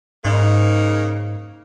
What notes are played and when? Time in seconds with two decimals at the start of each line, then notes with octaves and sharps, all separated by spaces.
0.25 G#2 C#3 A#3 D#4